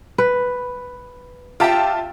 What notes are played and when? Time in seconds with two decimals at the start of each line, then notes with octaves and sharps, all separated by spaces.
0.18 B4
1.60 F4 G4 E5 G5 A5